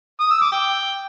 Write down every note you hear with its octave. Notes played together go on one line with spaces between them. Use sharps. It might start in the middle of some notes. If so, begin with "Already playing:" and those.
D#6
E6
D6
G5